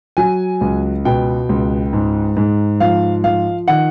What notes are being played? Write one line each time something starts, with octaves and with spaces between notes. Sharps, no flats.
F#3 G#5
C#2
B2 G5
C#2
G#2
G#2
F3 F5
F3 F5
D#3 F#5